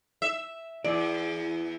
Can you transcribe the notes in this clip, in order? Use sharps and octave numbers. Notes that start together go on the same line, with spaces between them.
E5
E2 D5